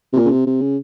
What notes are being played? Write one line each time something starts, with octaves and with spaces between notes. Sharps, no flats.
C3
A#2
C#3
C3
C3
C#3